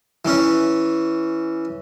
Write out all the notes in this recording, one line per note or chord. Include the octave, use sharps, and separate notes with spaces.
E3 C#4